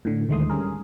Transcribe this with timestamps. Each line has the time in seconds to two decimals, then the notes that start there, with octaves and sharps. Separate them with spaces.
0.05 A2 D3
0.29 D2 D#3 G#3 A3 C6 D#6
0.50 G3 C#4 G#4 A#4